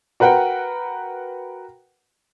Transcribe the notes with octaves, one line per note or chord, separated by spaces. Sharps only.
F#4 A#4 B4 F#5 G5